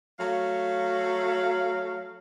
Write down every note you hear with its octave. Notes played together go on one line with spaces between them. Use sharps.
F#3 A3 F5